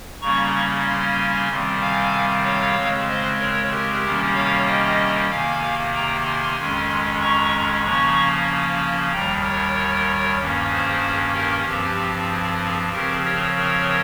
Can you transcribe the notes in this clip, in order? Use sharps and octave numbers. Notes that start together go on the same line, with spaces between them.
C#3 G3 A#3 C#4 A#5 C#6
G#5 C6
C3 D#3 G3 C4
F5 G#5
C#5 F5
C#3 G#3 C4
C5 D#5
A#4 C#5
G4 A#4
C3 D#3 G3 A#3 C#4
C#5 F5
D#5 G5
C3 D#3 A#3 F5 G#5
G5 A#5
G#5 C6
F2 D#3 G#3 C#4
A#5 C#6
C#3 F3 A#3 C#4 A#5 C#6
D#2 D#3 G3 G5 A#5
A#4 C#5
G2 D#3 A#3 C#4
G#4 C5
G4 A#4
G2 F3 C4 G4
G#4
C#3 F3 C4 G4 A#4
A#4 C#5
A#4 C#5